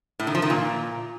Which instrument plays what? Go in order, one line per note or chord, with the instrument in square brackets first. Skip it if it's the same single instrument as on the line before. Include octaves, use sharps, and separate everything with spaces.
[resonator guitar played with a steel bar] A2
D#3
F3
D#3
A#2